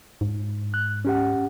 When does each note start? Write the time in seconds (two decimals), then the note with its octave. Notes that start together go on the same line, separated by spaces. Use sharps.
0.21 G#2
0.74 F#6
1.05 C#4 G4 F#5